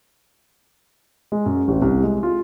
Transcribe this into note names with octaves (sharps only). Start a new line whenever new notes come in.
G#3
F#2
A1
C2
G#3
F4